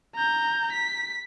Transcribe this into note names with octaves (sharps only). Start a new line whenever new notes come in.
A#5 G6
B6